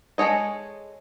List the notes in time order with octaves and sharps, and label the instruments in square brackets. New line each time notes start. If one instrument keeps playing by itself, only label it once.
[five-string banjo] G#3 B3 A4 C#5 D#5